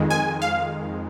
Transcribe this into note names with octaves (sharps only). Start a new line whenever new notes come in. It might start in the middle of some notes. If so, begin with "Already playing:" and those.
Already playing: F2 D#3 G#3
G#5
F5